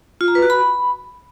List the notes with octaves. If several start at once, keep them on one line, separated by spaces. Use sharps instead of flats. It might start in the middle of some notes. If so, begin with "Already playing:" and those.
F4
A#5
B4
F#4
B5